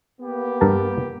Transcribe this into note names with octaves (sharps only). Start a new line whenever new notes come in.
A#3 B3 G4
G2 A#4 A5